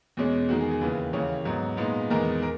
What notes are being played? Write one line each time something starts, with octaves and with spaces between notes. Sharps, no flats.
E2 B2 G#3 C#4
E2 D#3 G#3 D#4 F#4
G#4
G#4
D#2 C#3 E3 B4
D#2 C#3 E3 A#3 C#5
G#2 F#3 B3
A#2 G#3 B3 D#4
E2 D#3 G#3 B3 A#4
A#4